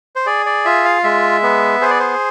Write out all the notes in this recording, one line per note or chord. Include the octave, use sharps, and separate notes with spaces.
C5
G#4 D5
D5
F4 E5
F5
G#3 E5
B3
G#4 C5
D5
C5